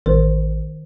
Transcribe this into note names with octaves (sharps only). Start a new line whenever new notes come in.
A1 D#3 A#4 C5